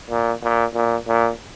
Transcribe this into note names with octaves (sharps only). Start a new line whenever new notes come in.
A#2
A#2
A#2
A#2